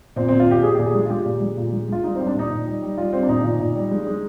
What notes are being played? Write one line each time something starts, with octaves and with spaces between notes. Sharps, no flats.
A#2 C4
A#2 C4
F4
A#2 G4
A#2 G#4
A#2 G4
G#4
G#3
F4
G#3 G4
A#2
G#3
A#2
G#3
G#3 F4
G3 D#4
G3 C4
D4
A#2 D#4
A#2
G3
G3
G3 F4
G3 C4
D4
A#2 D#4
A#2
A#2
G3
G#3
G#3